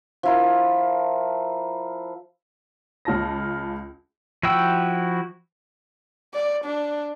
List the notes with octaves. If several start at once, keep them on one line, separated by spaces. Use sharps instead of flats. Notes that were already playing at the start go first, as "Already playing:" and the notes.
F3 E4 A#4
C#2 F4 A5 A#6
F3 E4 F#4 G5 E6
D5
D4